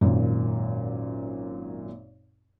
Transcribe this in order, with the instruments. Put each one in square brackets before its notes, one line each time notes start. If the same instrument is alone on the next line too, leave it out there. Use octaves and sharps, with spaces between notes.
[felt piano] G#1 F#2 A#2